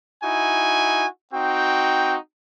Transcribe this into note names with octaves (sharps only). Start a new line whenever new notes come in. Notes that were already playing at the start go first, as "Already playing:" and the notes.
D#4 E4 F#4 G#5
C4 D#4 F#4 G5